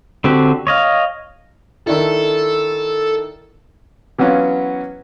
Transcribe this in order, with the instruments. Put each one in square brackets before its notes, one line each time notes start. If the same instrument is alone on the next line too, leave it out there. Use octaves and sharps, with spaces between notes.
[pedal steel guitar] D3 C4 F#4 G4
C#5 D#5 F5
[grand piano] D#3 D4 E4 [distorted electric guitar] A4
[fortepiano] E3 F#3 B3 C#4 F4